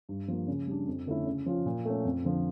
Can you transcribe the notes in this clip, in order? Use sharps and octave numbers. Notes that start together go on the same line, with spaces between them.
G2
F3 A#3
C#3
G3 D4
F2
D3 A3 C#4 E4
C#3
F3 C#4 F4
A#2
A3 C#4
F2
D3 F3